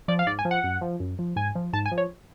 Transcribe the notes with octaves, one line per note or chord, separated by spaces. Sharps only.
F3 D5
F5
G#2 D5
G#5
F3
F#5
F#2
F3
F#2
F3
G#2 G#5
F3
G#2 A5
G#5
F3
C#5